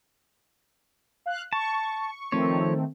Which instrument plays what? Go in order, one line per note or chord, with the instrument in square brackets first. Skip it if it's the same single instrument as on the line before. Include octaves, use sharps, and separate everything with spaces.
[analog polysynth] F5 F#6
[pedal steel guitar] A5 [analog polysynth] C#6
[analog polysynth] D#3 A3 C4 [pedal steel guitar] F3 C#5